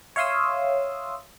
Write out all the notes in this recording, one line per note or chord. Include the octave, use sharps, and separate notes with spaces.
C#5 E5 F5 C6 D#6 E6